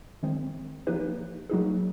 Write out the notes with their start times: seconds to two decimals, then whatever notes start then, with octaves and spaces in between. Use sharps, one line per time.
0.23 D#3 G#3 C4
0.87 F3 A#3 D#4 G4 B4
1.50 F#3 A#3 D#4 G#4